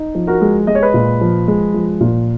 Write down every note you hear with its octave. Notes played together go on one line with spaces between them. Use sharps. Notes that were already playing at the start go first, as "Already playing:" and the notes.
Already playing: D#4
F3
F#4 A#4
G#3
G#3 D#5
C#5
B4 D#5
A#2
F3
G#3
F3
A#2